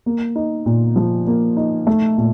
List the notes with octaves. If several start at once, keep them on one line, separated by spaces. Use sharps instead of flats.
A#3
D#4
A#2
F3
A#3
D#4
A3
A#2